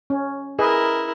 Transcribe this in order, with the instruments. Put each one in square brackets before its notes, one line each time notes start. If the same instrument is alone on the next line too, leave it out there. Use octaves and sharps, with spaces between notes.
[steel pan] C#4
[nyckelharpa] E4 A#4 [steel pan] G#4 B4 D#5